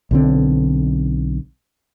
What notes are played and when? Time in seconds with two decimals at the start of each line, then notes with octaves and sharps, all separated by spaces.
0.11 B1 D3 C4